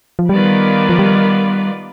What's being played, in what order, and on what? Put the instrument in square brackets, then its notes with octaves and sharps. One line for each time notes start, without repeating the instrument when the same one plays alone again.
[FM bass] F3
[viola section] D#3 B3 F4 B4 D5 [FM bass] G3
[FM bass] F3
G3